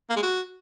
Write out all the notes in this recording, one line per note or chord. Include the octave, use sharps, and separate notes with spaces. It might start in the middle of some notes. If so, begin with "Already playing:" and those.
A#3
G#3
F#4